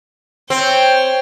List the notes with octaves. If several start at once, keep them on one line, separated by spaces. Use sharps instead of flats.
C4 C#5 G5